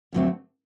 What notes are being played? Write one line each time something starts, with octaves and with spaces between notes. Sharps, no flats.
F2 D3 F#3 A3 C4